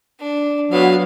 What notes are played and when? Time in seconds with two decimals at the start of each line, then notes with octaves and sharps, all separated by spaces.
0.20 D4
0.72 F#3 B3 F5